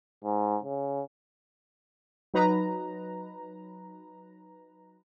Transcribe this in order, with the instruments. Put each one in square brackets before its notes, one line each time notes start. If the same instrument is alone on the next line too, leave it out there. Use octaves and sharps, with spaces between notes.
[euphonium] G#2
C#3
[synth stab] F#3 D#4 B4 A#5